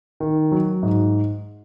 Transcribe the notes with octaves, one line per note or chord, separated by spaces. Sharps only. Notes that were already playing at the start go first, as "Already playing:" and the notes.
D#3
F#3
G#2